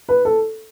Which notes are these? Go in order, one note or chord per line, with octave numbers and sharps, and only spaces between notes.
B4
A4